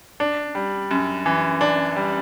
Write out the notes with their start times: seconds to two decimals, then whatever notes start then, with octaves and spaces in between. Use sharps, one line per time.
0.20 D4
0.55 G3
0.91 F#2
1.26 E3
1.61 D4
1.96 G3